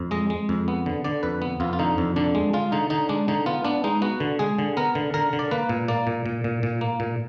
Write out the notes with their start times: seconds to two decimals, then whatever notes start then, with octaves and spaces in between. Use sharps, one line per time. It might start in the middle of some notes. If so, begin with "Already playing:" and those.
Already playing: F2
0.11 G#3 D#5
0.30 G#3
0.49 F2
0.68 B3
0.86 D3
1.04 D3 D5
1.23 F2 B4
1.42 B3
1.60 F2 F4
1.73 F4
1.79 D3 D#4
1.98 F2
2.16 D3 D4
2.35 G#3
2.53 G#3 F4
2.72 D3 D#4
2.90 D3 D#4
3.09 G#3 D4
3.28 D3 D#4
3.46 B3 F4
3.65 B3 D4
3.84 G#3 D#4
4.02 B3 F#4
4.20 D3
4.39 G#3 G#4
4.59 D3
4.77 B3 A#4
4.95 D3
5.14 D3 A#4
5.33 D3
5.39 D5
5.51 A#3 B4
5.69 A#2
5.88 A#3 D5
6.07 A#2
6.26 A#2
6.44 A#2
6.63 A#2
6.81 A#3
7.00 A#2